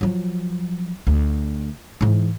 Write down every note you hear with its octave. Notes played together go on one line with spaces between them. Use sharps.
F3 F#3
D2
G#2 E3